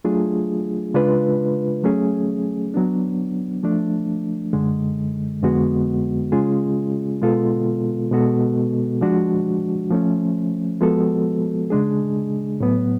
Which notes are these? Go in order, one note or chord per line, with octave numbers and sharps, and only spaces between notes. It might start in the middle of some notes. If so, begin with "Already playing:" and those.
F#3 A3 D4 F4 G#4
C#3 G#3 D4 F4 B4
F#3 A3 C#4 G#4
F#3 B3 D4
F3 A3 D4
F#2 D3 G#3
F2 D3 G#3 B3 F#4
C#3 G#3 C#4 F4 G#4
B2 G#3 B3 F4 A4
B2 G#3 B3 F#4 A4
F3 G#3 D4 F#4
F3 A3 C#4
F3 G#3 B3 F#4 A4
C#3 G#3 D4 G#4
A2 F#3 B3